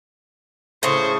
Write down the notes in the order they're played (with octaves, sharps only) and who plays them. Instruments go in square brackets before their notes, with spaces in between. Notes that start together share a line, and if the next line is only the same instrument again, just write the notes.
[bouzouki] A2 C#3 [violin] C5 [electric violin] C#6 D#6